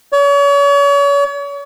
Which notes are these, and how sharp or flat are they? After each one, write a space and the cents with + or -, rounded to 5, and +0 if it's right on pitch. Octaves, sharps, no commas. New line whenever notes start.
C#5 +40